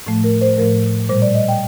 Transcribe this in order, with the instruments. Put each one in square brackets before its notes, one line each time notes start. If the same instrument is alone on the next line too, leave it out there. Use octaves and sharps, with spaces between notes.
[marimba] A2 F3 A3
A#4
C5
A2 F3 A3 A#4
A#2 G3 C5
D5
D#5
G5